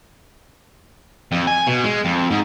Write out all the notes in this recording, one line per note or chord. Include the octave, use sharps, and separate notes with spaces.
F2
G#5
B2
G#3
F2
G#2